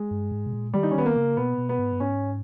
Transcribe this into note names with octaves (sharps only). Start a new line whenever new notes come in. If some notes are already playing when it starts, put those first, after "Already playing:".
Already playing: G#3
G2
G#2
B2
A#2
D#3 G3
D#4
C#4
D#3 B3
A#3
C#3
B2 B3
B2
B3
G#2
G2
G#2 C#4